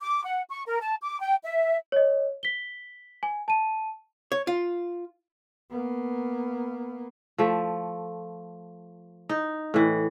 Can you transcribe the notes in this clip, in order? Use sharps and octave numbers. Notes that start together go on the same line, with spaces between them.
D6
F#5
C#6
A#4
A5
D6
G5
E5
C#5 D#5
B6 G7
G#5
A5 D#7
C#5
F4
A#3 B3
F3 A3
D#4
A2 E3